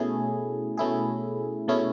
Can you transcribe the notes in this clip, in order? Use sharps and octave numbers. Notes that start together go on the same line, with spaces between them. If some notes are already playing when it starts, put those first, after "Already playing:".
Already playing: B2 A3 C#4 E4 G#4
B2 A3 C#4 E4 G#4
B2 A3 C#4 E4 G#4